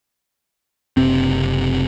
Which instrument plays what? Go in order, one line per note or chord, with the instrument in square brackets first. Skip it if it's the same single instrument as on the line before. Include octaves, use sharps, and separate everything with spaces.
[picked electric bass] F#1 C3 C4